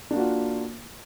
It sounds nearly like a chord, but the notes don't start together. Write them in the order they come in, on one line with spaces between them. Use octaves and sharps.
D4 A#3 F#4 F4